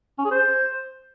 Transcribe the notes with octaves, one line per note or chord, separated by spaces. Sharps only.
C#4
G#4
C5